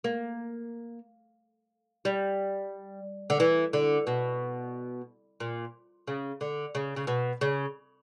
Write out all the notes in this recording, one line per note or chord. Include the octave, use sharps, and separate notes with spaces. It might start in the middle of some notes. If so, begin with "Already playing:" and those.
A#3
G3
D3
E3
D3
B2
A#2
C#3
D3
C#3
C#3
B2
C#3